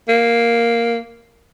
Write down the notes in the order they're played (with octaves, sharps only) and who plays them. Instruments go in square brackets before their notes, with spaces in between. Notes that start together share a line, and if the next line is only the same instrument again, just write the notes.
[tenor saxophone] A#3